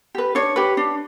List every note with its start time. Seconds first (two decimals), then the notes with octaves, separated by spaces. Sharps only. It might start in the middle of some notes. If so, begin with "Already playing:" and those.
0.15 G4 B4
0.35 D4 C#5
0.56 G4 B4
0.77 D4